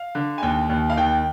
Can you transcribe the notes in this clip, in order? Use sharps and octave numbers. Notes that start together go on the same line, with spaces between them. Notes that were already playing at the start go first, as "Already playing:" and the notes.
Already playing: F5
D3
G#5
D#2 G5
D#2
F5
D#3 G5